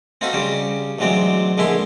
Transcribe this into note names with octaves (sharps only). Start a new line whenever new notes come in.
C4 D#4 F4 F#4 A4 B4
C#3 G3 C#4
A1 D2 F#3 G#3 C4 D5
A#1 D3 G#3 E4 E5 C6